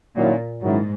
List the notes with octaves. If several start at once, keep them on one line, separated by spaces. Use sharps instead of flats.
A#2 D#3 F#3 A#3 C#4 E4
G#2 D#3 F#3 C#4 E4